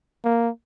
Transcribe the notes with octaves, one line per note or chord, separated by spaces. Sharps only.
A#3